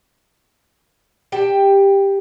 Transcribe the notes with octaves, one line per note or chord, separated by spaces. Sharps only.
G4 G5 A5